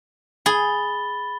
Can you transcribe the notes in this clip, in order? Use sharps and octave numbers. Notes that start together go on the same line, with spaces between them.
G#4 B5 A6 G7